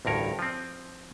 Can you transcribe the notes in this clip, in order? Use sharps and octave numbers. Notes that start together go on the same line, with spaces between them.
A1 D2 G2 A#4 C#5
F3 C4